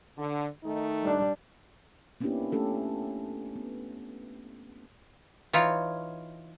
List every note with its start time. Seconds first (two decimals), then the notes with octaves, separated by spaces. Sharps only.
0.18 D3
0.63 D#3 A3 D#4
1.03 G3 D4
2.21 A#3 B3 C#4 D4 E4 G4
2.52 A3 C#4 G4 A4
3.56 B3
5.53 E3 D#4 F4 C#5